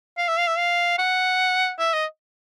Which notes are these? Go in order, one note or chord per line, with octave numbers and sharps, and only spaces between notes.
F5
E5
F5
E5
F5
F#5
E5
D#5